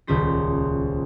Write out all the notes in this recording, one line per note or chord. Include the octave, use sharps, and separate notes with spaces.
D#1 C#2 C#4 C5 B6